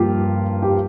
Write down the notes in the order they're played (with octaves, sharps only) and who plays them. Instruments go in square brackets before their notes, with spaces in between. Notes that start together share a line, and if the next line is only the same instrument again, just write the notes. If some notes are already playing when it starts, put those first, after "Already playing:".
Already playing: [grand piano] G2 F3 A#3 F4 G4
G4